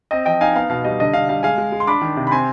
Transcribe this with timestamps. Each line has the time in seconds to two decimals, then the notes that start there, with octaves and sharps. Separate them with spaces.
0.11 C4 D#5
0.26 F3 D#5 G5
0.41 D#4 F5 G#5
0.56 B3 F5
0.70 B2 F5
0.84 G3 D#5
1.00 D3 D#5
1.14 D3 F5
1.29 G3 F5
1.43 G#3 F5 G#5
1.58 G#3
1.72 G#3
1.80 C6
1.87 D4 B5 D6
2.02 D#3
2.17 C3
2.27 B5
2.31 C4 G#5 C6